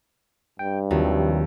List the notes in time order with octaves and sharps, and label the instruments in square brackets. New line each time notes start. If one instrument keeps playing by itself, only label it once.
[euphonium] G2 [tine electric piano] G5
[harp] D#2 [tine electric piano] C3 F3 F#3